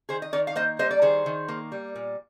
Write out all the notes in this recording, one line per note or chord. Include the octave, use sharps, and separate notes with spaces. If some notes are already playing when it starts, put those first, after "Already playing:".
D#3 G#4 C5
D#5
D#3 A#4 D5
F5
A#3 C5 D#5
G3 C5 D#5
D5
D#3 G#4 C5
D#3
A#3
G3
A#2